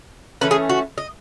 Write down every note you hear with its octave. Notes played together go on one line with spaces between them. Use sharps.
E3 A3 C#4 B4
G#4
F#4
D#5